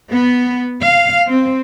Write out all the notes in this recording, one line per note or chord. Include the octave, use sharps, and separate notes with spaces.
B3
F5
C4